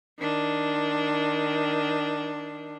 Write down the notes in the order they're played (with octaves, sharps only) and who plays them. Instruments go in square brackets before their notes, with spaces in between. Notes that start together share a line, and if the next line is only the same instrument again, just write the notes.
[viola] D#3 D4